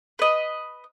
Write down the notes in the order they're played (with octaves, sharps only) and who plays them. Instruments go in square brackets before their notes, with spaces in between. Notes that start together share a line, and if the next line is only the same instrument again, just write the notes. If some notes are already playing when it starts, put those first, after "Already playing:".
[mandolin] B4 D#5